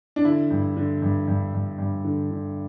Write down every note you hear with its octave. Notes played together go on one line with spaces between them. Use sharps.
D4
D3 E4
G2
D3
G2
G2
G2
G2
D3
D3